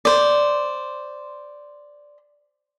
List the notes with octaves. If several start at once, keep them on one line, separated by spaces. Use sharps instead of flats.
C5 D5